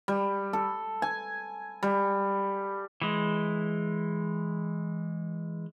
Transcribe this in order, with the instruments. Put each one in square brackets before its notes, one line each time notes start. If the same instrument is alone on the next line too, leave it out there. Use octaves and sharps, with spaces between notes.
[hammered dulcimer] G3
A4
G#5
G3
[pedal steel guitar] E3 G#3